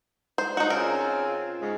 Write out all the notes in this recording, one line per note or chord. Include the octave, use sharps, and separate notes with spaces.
C5
D#4 F#4
C#3 C4 F4 A#4
G#2 C#3 G#3